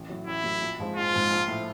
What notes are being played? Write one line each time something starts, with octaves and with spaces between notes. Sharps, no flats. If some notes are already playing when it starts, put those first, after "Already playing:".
Already playing: A1
A2 F#3
A1 E4
A2 F#3
A#1
G#2 F3 G#3 C4
A#1 F4
G#2 F3 G#3 C4
A#1
A2 F3